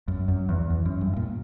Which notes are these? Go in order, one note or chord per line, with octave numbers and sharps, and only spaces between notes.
F#2
F#2
E2
E2
F#2
G2
A#2